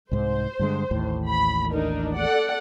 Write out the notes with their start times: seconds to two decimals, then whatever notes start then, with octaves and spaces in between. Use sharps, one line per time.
0.11 C2 G#2 C5
0.59 G2 D3 G#3
0.91 A1 D#2 A2
1.26 B5
1.70 D4 D#4 A#4
2.15 A4 D5 F#5